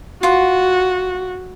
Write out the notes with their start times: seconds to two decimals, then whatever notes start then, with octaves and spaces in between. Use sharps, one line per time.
0.23 F4 F#4 F#5